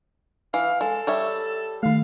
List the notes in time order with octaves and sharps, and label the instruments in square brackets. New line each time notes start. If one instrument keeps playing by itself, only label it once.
[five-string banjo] E3 [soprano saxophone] F5
[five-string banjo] G#3 [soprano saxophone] A4
[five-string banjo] G3 C#5 E5
[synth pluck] D#3 A3 [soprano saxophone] F5